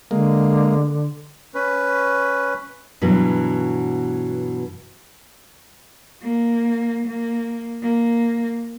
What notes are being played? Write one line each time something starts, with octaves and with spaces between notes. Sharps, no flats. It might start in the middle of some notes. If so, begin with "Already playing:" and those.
D3 G#3 A#3
C#4 B4
G2 B2 E3 F#3
A#3
A#3
A#3